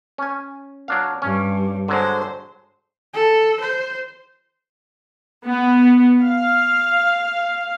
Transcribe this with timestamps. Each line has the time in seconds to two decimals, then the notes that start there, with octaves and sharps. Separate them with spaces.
0.18 C#4 G#5
0.88 F#3 D4 F5
1.22 G2 C#4
1.88 D3 F#3 G#3 C5
3.14 A4
3.61 C5
5.46 B3
6.21 F5